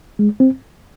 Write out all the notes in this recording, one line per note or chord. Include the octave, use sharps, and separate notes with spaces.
G#3
C4